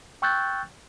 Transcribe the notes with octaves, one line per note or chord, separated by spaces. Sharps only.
G5 C#6 E6 F#6 G6 A6